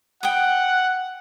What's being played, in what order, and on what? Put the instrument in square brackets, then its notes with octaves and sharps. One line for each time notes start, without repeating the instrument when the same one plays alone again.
[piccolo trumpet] F#5 [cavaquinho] G5 D#6